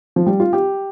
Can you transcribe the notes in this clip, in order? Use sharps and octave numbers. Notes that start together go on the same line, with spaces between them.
F3
G3
F4
G4